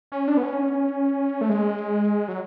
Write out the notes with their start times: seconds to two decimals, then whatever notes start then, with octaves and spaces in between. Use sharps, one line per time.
0.12 C#4
0.28 D4
0.37 B3
0.43 C#4
1.41 A3
1.49 G#3
2.28 F#3